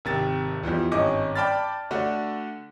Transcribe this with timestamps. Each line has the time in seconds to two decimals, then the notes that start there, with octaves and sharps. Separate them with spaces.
0.05 G#1 C3 A6
0.63 E2 E3 F3 G3
0.91 G#1 G2 C#4 D#5 D6
1.35 D5 G5 A5 B5 F6 A6
1.91 D3 A3 D4 F#4